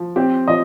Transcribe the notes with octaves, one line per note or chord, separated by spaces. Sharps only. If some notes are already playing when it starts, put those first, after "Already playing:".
Already playing: F3
C4 G4
F3 D#5